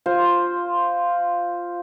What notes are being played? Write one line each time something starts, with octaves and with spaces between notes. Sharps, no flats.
F4 C5